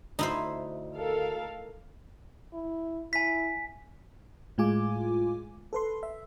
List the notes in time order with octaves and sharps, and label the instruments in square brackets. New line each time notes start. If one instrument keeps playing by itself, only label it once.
[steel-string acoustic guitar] D2 [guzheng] D#4 E4 C5
[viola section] A4 A#4 F5
[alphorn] E4
[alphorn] E4 [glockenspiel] G#5 B6
[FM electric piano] A2 G#3 F4 G#5 D6
A4 B4 C6
E5